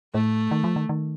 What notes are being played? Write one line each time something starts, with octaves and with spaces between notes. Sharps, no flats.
A2 A3
D#3
F3
D#3
D#3